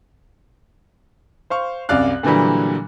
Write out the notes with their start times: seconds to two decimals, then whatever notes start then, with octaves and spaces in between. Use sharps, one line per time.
1.50 C5 F5 C#6
1.89 C2 F#2 D5 F5 F#6
2.23 A#2 D3 E3 F#3 G3